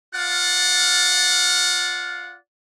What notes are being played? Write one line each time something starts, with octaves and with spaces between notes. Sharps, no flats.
F4 D5 F5 F#5